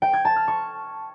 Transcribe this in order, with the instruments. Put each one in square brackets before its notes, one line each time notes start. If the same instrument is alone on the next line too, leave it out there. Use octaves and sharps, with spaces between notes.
[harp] G5
G#6
A5
F6
C#6